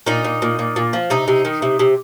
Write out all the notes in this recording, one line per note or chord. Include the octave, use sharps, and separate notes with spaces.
A#2 D#4
A#2
A#2
A#2
A#2
F3
C3 D#4
C3
D#3
C3
C3